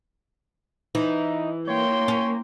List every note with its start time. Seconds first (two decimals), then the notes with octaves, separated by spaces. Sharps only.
0.95 E3 D#4
1.67 A#3 C#5 G5 C6
2.08 C#4